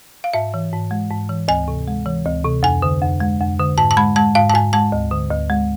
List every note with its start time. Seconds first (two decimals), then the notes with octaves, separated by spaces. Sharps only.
0.24 F5
0.33 G#2 E5
0.54 E3
0.73 G#2
0.91 G#3
1.11 G#2
1.29 E3
1.48 D2 G#5
1.68 C3
1.88 G#3
2.06 E3
2.26 D2
2.45 C3
2.63 F2 G#5
2.82 D3
3.02 F2
3.20 G#3
3.40 F2
3.59 D3
3.78 G#2 A5
3.91 A5
3.97 G#3 B5
4.16 G#3 A5
4.35 G#2 F5
4.50 A5
4.54 G#2 G#5
4.73 G#3 A5
4.92 D2
5.11 D3
5.31 D2
5.50 G#3